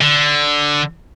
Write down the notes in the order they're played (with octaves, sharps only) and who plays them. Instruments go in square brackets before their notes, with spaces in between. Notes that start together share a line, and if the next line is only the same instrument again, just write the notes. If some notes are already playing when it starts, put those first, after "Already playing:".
[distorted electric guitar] D3